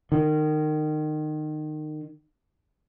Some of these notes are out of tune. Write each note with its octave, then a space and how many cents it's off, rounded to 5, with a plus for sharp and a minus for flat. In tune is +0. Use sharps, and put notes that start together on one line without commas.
D#3 -25